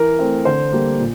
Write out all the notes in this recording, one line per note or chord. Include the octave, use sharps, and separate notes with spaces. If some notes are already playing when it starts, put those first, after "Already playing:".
Already playing: E3 A#4
A3 C4
D3 C5
G3 A#3
A#2